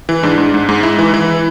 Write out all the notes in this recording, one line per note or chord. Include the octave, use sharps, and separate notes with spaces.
E3
G#2 D4
G#2
G#2
G#2
G#2 E4
E3
E3